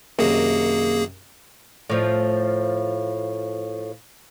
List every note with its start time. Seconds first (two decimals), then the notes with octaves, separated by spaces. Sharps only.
0.19 F#2 C3 D#3 A#3 G#4
1.90 A2 F3